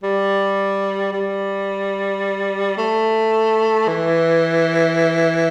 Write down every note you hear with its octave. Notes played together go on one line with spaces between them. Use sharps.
G3
G3
A3
E3